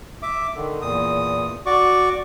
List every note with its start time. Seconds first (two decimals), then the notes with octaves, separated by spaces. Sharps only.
0.23 E5 D6
0.56 D3 D#3
0.82 E2 A#2 D#6
1.66 F#4 D5 C#6 D6